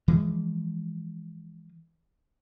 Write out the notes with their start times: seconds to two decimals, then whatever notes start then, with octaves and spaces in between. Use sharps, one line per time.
0.08 E3 F3 G#3